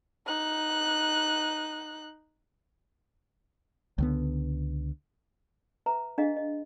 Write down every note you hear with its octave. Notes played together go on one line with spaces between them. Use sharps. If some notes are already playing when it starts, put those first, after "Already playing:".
D#4 F#6
C#2 D3 B3
B4 E5 A#5
D4 G#4 D#5 F5
D#5